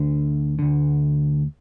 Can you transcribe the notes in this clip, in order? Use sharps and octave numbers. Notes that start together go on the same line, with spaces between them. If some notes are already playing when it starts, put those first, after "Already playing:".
Already playing: D2 D3
D2 D3